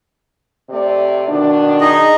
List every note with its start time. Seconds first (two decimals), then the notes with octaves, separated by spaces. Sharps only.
0.70 C3 A3 D5
1.28 B2 D#3 D4
1.81 D#4 G#4 D#5